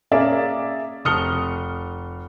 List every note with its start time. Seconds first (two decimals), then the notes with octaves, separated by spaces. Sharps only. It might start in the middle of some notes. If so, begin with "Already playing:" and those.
0.11 A#3 C#4 G#4 D5 E5
1.05 F1 D#6 F6 C#7 G7